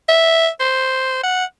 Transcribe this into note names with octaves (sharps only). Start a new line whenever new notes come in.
E5
C5
F#5